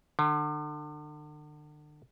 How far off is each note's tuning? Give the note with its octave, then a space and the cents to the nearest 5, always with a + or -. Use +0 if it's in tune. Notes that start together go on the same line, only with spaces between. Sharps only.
D3 +35